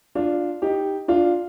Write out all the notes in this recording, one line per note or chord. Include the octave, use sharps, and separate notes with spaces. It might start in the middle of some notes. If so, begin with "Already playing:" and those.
D4 F4
D#4 G4
D4 F4